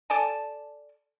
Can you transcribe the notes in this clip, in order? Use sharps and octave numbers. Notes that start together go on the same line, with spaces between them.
A4 D5 G#5 A5